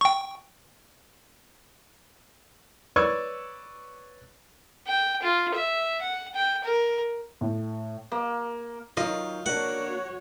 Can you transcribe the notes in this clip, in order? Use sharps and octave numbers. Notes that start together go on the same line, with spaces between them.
G5 C#6
B4 C#5 D5 C#6 E6 G#6
G5
F4
E5
F#5
G5
A#4
A2
A#3
D#3 F#3 F4 D#5
A#3 D4 F#4 C#5 F#5